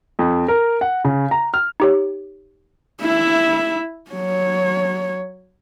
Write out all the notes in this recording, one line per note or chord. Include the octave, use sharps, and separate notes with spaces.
F2
A#4
F#5
C#3
A#5
F6
D#4 G4 C#5
E4 E5
F#3 C#5